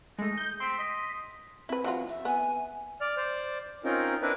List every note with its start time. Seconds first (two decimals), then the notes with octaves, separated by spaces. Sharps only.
0.19 G#3 A3 D#4
0.38 G6
0.60 C4 C6 B6
0.78 D#5
1.69 C4 E4 B4
1.84 E3 F#3 F4
2.10 E5
2.25 B3 G#5
3.01 D5 F6
3.17 C5 D5
3.84 C4 C#4 D#4 F4 A#4
4.22 C4 D4 E4 A#4 B4